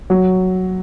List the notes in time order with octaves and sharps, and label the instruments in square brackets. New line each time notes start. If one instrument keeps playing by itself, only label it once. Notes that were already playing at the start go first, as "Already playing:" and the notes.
[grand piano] F#3